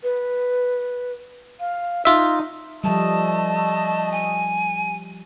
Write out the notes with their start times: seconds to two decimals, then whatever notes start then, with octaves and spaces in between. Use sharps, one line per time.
0.03 B4
1.60 F5
2.05 D#4 F4 E5
2.84 F3 G3 A3 D#5 A5
4.11 G#5